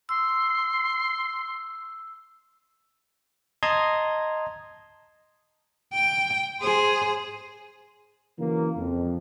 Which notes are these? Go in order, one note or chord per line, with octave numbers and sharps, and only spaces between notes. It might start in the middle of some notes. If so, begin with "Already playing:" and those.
C6 E6
D#5 A5 A#5 C6 D#6 G#6
G5
G#4 C5
C#3 E3 F#3 A#3
F2